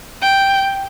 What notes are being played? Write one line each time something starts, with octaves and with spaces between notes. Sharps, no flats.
G5